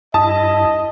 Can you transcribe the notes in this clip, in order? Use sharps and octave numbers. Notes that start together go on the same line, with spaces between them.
G2 E4 D#5 A5 D#6